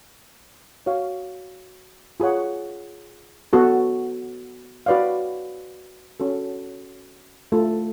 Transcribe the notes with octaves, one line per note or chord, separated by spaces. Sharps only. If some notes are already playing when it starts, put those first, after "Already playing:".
F#4 C#5 F5
F4 G#4 C#5 F#5
B3 F#4 A4
F#4 B4 D5 F5
C#4 F#4 A4
A3 F4 A4